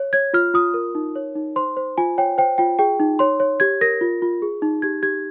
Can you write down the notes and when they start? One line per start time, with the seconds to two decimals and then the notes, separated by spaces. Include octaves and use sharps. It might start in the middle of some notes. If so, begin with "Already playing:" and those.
Already playing: C#5
0.13 C#5 G#6
0.33 F4 F6
0.54 F4 D#6
0.74 A#4
0.95 D#4
1.16 C#5
1.36 D#4
1.56 C5 C6
1.77 C5
1.98 F4 G#5
2.18 C#5 G5
2.38 C5 G5
2.58 F4 G5
2.79 G#4 G5
3.00 D#4
3.19 C#5 C6
3.40 C#5
3.60 G4 G#6
3.81 A#4 A#6
4.01 F4
4.22 F4
4.42 G#4
4.62 D#4
4.82 G4 G#6
5.03 G4 G#6